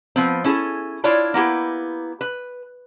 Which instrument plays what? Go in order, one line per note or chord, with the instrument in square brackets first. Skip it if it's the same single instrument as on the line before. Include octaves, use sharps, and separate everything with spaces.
[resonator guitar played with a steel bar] F3 B3 C4
C#4 E4 G#4 A4
D4 E4 F4 C#5 D5
A#3 B3 E4 G4
B4